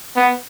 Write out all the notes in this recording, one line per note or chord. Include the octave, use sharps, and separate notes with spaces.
B3